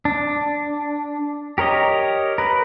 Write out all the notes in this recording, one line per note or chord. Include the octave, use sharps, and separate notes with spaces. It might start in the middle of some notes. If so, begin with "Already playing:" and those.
D4
G4 A#4 C#5 D#5
A#4 B4